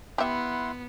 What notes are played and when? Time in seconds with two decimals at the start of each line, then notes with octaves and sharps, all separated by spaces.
0.18 B3 E4 G4 E5 F#5 C6